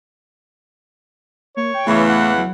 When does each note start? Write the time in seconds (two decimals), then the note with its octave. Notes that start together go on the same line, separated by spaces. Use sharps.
1.57 A#3 C#5
1.74 G5
1.87 E2 C#3 E3 A3
2.09 F#5
2.38 F#3